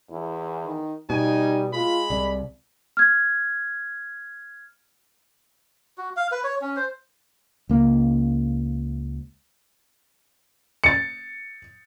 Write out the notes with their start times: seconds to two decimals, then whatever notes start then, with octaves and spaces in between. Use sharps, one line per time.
0.11 E2 E4
0.65 D#3
1.10 B2 G3 D#4 G#5
1.73 G#3 F4 B5
2.10 C2 D5
2.97 F6 G#6
5.98 F#4
6.16 F5
6.32 B4
6.44 C#5
6.62 C#4
6.76 C5
7.69 C#2 A#3
10.84 A6 C#7